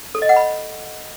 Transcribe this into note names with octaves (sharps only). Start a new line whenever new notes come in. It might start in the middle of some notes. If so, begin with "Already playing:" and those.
A4
D#5
F#5
B5